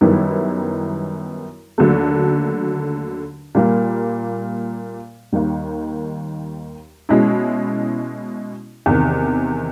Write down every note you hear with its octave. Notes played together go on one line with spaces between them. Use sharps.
F#2 D#3 G3 B3 E4
D#2 D3 F#3 A3
A#2 G3 A#3
D#2 D#3 G3
B2 G#3 C#4 E4
E2 C3 D#3